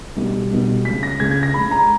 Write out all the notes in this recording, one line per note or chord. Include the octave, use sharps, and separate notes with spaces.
B1 B2 G3
B1 B2 G3
C#2 C#3 G#3 B6
A#6
C#2 C#3 G#3 G#6
G#6
A#6
C#2 C#3 G#3 B5
A#5